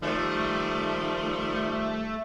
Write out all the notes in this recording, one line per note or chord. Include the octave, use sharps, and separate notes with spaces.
D#3 F3 G3 A3